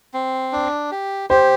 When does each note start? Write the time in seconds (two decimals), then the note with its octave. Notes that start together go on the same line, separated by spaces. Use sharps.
0.14 C4
0.52 D4
0.91 G4
1.30 G4 C5